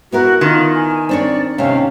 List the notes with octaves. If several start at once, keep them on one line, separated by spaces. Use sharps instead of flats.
B3 E4 F#4 A#4
D#3 F4
G#5
C4 D4 C#5 D5
D#2 C3 C#4 F5